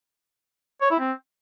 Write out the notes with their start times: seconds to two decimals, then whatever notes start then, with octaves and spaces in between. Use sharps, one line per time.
0.81 C#5
0.90 E4
0.99 C4